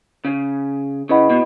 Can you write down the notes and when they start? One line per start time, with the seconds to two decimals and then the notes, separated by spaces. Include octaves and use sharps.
0.25 C#3
1.09 C#3 E4 B4 D#5 F#5 B5
1.30 B2